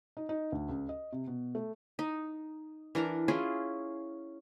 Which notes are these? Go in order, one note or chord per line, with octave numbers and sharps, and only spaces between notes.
D#4
D#4
D2
C#2
D#5
C3
B2
A3
D#4
E3 D4 A#4 A#5
C#4 E4 F4 G#4